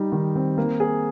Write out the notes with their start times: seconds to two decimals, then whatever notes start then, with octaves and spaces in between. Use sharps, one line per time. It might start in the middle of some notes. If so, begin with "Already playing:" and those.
Already playing: G3 D#4
0.12 D#3
0.36 C4
0.58 A#3
0.80 G#4